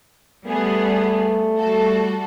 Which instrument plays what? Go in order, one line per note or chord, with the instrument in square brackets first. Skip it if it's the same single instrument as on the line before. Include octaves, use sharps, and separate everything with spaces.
[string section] G3 B3 G#4 [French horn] A3
[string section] G3 F#4 A4